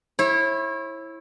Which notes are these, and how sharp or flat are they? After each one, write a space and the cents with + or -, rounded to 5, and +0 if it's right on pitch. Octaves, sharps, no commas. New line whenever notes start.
E4 +0 C#5 -40